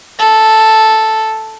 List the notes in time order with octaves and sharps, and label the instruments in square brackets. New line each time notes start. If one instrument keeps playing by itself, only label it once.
[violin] A4